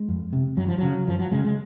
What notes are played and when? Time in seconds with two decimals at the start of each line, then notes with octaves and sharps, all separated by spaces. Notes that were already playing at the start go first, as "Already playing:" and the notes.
Already playing: G#3
0.09 F2
0.33 C3
0.57 F#2 F#3
0.68 F3
0.78 C#3 F#3
1.07 F#2 F3
1.19 F#3
1.31 C#3 G#3
1.45 G#3